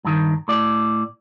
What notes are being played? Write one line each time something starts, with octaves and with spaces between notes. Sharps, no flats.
G2 D#3
A2 D5